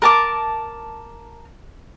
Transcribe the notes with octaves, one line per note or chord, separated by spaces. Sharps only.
A#4 A5 D6